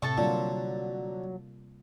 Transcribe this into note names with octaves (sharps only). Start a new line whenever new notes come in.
A2 C3 A4 A5 C#6
D3 F#3 G3 A#3 F4